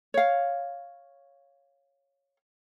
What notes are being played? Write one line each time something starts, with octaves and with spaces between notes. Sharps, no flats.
C#5 F5